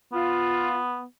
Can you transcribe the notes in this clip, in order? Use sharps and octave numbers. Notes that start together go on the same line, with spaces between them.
B3 F4